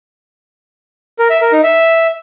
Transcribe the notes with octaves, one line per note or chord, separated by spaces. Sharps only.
A#4
E5
A#4
D#4
E5